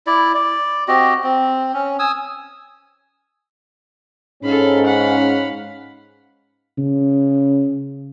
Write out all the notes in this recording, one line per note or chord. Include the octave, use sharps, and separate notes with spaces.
E4 D5
D5
C4 F#4 G4 D#5
C4
C#4
G#5 D#6 E6
G#2 C#4 A4 F5 B5
F5 F#5 B5
C#3